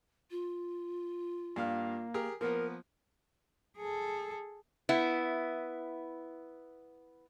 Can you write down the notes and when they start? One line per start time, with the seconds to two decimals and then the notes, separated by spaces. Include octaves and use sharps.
0.31 F4
1.56 G2 A#3 F5 F6
2.14 G4 G#4 A#4
2.41 F3 A#3 B3 A#4
3.77 G#4 A4
4.89 B3 E4